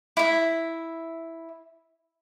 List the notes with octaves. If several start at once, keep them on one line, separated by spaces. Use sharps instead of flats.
E4 E5